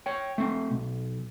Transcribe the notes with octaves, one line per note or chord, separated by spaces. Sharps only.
C#5 G5
A3 C4
B1